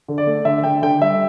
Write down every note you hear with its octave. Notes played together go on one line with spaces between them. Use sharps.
D3
D5
A3
D3 E5
D3 G5
D3 G5
G3 E5